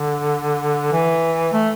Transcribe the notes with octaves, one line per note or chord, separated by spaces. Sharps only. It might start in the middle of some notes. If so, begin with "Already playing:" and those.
Already playing: D3
E3
A3